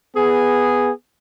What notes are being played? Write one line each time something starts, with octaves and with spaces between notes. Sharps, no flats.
B3 G#4